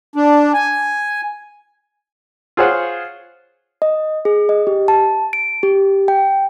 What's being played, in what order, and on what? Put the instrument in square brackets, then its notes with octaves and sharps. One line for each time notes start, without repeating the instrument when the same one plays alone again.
[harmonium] D4
G#5
[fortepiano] F4 G#4 C5 C#5 F#5
[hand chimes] D#5
G#4
D#5
G4
A5
D7
G4
G5